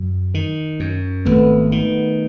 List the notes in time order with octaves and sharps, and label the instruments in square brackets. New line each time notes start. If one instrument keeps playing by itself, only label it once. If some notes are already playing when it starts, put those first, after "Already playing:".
Already playing: [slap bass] F#2
D#3
F#2
[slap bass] G#1 [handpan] A3 B3
[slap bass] D#3